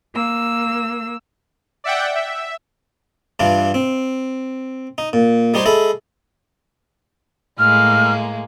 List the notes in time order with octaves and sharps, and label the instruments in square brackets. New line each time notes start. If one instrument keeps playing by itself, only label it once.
[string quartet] A#3 E6
[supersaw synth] D5 E5 F#5 G5
E5
[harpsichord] G2 E3 D4 F4
C4
D#4
A#2
G3 D#4 G4 C5 C#5
G#3 A4 E5 B5
[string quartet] A2 G#3 A#3 [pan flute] F6